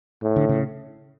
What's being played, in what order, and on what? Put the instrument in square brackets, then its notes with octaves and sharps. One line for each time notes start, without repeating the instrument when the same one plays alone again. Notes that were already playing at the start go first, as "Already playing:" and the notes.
[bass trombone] A2
[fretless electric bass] D3
C#3